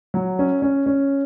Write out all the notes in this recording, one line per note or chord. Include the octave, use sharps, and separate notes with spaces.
F#3
C#4
C#4
C#4